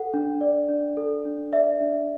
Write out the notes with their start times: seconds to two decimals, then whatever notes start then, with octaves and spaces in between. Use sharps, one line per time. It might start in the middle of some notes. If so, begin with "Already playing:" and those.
Already playing: A4 F#5
0.14 D4
0.41 D5
0.69 D4
0.97 A4
1.25 D4
1.52 D5 E5
1.81 D4